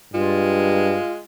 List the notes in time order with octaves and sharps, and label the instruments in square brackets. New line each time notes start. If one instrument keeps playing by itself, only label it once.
[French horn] G2 [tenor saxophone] G#3 [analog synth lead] F4